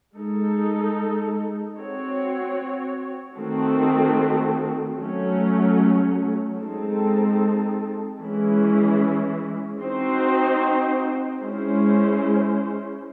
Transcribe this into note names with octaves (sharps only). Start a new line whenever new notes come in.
G#3 D#4 A4
C4 F#4 C#5
D#3 A3 C4 F#4 A4
F#3 A3 C#4
G#3 C4 D#4 A4
E3 G#3 C#4 E4
C4 D#4 F#4 C5
G#3 C#4 E4 C5